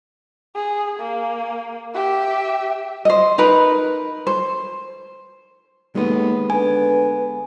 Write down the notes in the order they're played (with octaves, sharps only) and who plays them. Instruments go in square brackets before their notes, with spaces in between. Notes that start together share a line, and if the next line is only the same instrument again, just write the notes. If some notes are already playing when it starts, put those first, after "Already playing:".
[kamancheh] G#4
A#3
G4 E5
[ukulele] C5 D#5
D#4 A#4 B4
C5
[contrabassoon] D#2 [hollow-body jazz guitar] G#3 A3 B3
[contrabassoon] D3 [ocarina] B4 [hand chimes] G#5